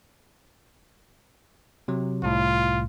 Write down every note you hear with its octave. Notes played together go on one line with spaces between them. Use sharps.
C3 F#3
C2 A2 F4